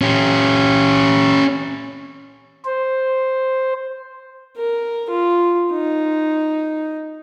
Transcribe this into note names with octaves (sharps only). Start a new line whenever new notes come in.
C#4 G4
C5
A#4
F4
D#4